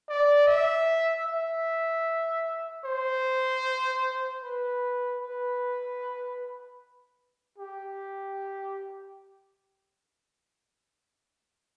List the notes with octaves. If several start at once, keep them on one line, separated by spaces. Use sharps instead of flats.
D5
E5
E5
C5
B4
B4
G4